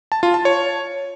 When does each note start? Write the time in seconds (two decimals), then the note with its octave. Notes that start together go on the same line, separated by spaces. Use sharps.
0.12 A5
0.23 F4
0.34 A5
0.45 C#5